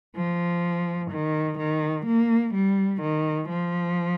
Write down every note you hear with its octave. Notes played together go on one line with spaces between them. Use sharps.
F3
D#3
D#3
A#3
G3
D#3
F3